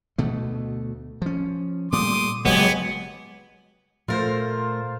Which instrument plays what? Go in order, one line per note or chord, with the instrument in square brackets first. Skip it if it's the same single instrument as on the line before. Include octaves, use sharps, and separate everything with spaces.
[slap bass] D2 B2 A3
F3 C#4
[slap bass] A#2 G3 A3 [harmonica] C6 D6 D#6
[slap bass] F#1 F#2 [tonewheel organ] F#3 G#3 [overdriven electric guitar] B3 [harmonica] G4 G#5
[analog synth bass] A#2 [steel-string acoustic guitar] A3 A#4 [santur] F4 C5